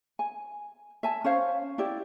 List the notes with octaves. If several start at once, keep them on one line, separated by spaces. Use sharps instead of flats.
G#5
E5 G#5 A5
C#4 C5 C#5 F5
E4 G4 D5